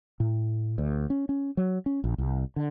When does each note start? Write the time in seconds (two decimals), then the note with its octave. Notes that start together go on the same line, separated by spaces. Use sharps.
0.20 A2
0.78 D2
1.10 C#4
1.29 C#4
1.57 F#3
1.86 C#4
2.04 A#1
2.18 C2
2.56 D3